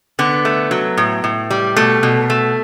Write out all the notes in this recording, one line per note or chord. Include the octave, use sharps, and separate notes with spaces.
D3 B3
A3
F#3
A2
A2
G3
B2 A3
B2
A3